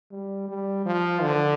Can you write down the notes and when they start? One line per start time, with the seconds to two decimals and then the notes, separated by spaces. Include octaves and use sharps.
0.12 G3
0.48 G3
0.86 F3
1.22 D3